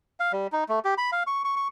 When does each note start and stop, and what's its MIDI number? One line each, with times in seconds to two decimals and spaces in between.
0.20 0.32 77
0.32 0.47 55
0.52 0.64 63
0.69 0.79 57
0.85 0.94 67
0.98 1.10 83
1.12 1.23 77
1.27 1.42 85
1.44 1.55 85
1.56 1.68 85